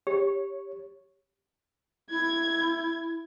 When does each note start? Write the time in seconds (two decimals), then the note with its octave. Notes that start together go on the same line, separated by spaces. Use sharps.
0.07 G4 C#5
2.10 E4 G#6